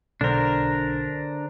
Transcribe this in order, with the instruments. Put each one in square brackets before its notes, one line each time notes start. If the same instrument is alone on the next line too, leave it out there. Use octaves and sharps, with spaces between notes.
[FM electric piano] B1 [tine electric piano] D3 C5 [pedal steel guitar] D4 A#4